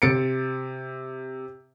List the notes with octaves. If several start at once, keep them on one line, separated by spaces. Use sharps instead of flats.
C3 A6 C#7 D7